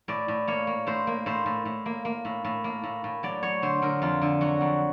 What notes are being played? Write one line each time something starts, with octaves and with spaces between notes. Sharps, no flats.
A2 D5
A2
A#3 C#5
A#3
A2 C5
A#3
A2 C5
A2
A2
A#3
A#3
A2
A2
A#3
A2
A2
F#3 D5
F#3 C#5
D3 C5
D3 A#4
F2 F4
D3
F#3 F#4
F2